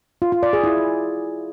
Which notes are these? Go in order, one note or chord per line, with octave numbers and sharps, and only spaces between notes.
F4
F4
D5
G#4
E4